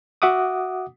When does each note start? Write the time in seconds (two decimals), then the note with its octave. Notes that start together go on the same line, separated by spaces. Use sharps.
0.22 F#4 E5 F#5 D6 D#6